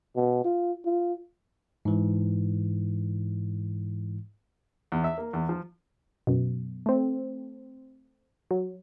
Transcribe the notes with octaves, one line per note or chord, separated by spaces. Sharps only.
B2
F4
F4
G#2 E3
E2
E5
A#3
E2
F3
F#2 B2
A3 C4
F#3